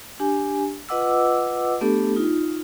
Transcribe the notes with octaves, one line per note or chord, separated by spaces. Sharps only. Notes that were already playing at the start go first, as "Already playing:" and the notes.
D4 G4 G#5
F4 B4 D#5 F#5 D6 E6
A3 B3 D4 G4 A4
D#4 F4